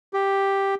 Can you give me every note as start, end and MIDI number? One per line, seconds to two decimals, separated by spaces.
0.14 0.75 67